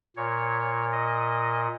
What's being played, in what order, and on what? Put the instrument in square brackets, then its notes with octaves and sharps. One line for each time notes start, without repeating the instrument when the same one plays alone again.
[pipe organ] A#2 C#5
D#5